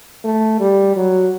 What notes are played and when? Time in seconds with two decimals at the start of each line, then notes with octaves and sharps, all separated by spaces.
0.24 A3
0.60 G3
0.96 F#3